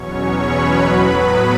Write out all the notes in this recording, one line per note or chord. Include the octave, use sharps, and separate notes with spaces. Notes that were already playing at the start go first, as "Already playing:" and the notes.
Already playing: E2 B2 F#3 C#4 C#5 C#6
B4 B5
A2 F#3 B3